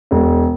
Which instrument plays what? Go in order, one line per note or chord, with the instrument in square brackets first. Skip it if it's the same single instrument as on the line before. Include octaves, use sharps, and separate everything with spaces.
[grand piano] E1